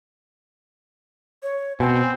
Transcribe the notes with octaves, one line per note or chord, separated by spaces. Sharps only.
C#5
B2 C4 G#5